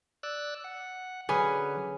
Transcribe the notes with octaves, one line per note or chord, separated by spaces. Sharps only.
D5 E6 F#6
F#5
D3 F#3 C#4 G#4 B4